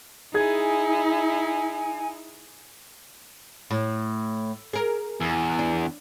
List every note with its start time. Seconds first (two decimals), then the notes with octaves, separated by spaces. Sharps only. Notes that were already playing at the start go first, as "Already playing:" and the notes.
0.34 D#4 E4 G#4 G#5 G#6
3.70 A2
4.73 G#4 A#4
5.21 E2
5.59 D4